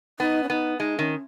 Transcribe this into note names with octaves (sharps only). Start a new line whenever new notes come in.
B3 D#4
C#4
B3 D#4
G#3 D#4
D#3 C#4